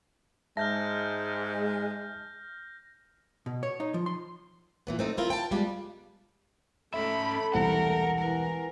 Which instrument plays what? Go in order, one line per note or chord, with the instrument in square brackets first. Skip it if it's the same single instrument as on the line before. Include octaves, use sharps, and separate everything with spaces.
[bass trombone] G#2 [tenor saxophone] G#3 [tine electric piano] E5 A5 [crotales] F6 G6 A#6
[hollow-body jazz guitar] B2
C#5
D#4
F3
C6
[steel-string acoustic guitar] A#2 E3 B3
A3 C4 D#4
C4 E4 F4 A#4
G5 A5
G3 G#3 B3 F4 D5
[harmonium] A3 A4 [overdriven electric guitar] C#4 E5 [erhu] B5
[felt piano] E1 C2 C5 [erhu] A#4 [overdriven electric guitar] F#5
[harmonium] E3 [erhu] A#4